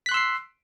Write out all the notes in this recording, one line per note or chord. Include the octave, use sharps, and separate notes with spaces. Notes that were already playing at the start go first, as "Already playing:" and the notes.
C6 E6 F#6 B6 C7